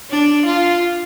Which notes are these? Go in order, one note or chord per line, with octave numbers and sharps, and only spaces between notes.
D4
F4